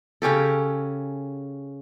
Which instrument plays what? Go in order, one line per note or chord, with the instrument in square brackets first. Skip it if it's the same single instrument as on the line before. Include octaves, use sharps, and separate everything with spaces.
[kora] C#3 C#4 G4 A4